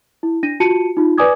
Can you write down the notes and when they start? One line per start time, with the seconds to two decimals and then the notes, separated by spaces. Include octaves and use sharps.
0.23 E4
0.43 D4 A#6 D#7
0.60 F4 F#4 A5 C#7 D#7
0.97 D#4 F4
1.18 B4 D5 G#5 D6 D#6 G#6